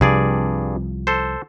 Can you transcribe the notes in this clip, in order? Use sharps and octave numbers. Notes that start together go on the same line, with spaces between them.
C2 G2 C3 F3 G#4 D5
A4 C5